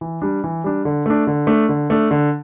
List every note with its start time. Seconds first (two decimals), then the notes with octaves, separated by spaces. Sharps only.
0.01 E3
0.22 G3 D4
0.44 E3
0.64 G3 D4
0.85 D3
1.06 A3 D4
1.27 D3
1.47 A3 D4
1.69 D3
1.90 A3 D4
2.11 D3